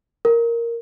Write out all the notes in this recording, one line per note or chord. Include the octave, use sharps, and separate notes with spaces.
A#4